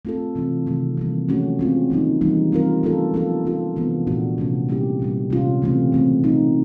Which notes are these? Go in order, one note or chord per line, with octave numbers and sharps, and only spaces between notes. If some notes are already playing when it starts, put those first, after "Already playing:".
A3 C4 F4 A4
C3 E3 G#3 C4 F4
C3 D#3 F#3 A3
E3 G3 A#3
F3 A3 C#4 F#4
G#3 C4 F4
D#3 F#3 A#3 D#4
E3 G3 A#3 D#4
G3 C4 F4 A#4
F#3 A3 C#4 F4 A4
F3 A#3 C#4 F4 A4
G3 A#3 C#4 F4 A4
C3 E3 G#3 B3 D4
A#2 F3 A3 D4 F#4
C3 F3 A3 C#4
G3 A#3 C#4 E4 G4
A#2 G3 A#3
C3 D#3 G#3 C#4 F4
C#3 E3 A3 C4
E3 A3 C4
A3 C4 D#4